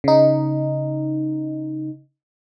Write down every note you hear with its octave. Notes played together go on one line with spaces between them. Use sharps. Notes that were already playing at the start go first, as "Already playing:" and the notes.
C#3 D#4